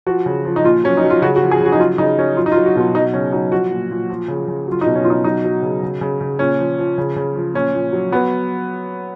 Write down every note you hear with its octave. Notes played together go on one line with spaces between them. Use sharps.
F3 F#4
C#3
F3
D#4
A#2 F4
F#3 C#4
D#4
F#3
F4
C#3 F#4
F#4
F3
G#4
C#3 F#4
D#4
F#3 F4
C#3 D#4
F#3 C#4
F#3 F4
D#4
F4
F#3
F#4
B2 F4
F#3 D#4
C#3 C#4
F#3 D#4
F3 F#4
A#2
A#2
F3
C#3
C#3
F#3 F4
D#4
B2
C#4
B2 F4
D#4
F#3 D#4
F#3
C#3
C#3
C#3
C#3
A#2 C#4
F3
F3
C#3
C#3
F3
A#2 C#4
A#2
F#3
F#3 B3